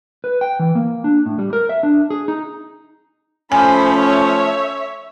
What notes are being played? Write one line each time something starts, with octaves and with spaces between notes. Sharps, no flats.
B4
G5
E3
A#3
D4
A2
G3
A#4
E5
D4
G#4
D#4
F3 A3 C#4 C5 G#5 B5
C#5 E5